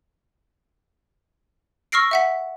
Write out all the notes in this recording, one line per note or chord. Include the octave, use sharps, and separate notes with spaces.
C#6 E6 F6 A#6 C7 D7
E5 F#5 B6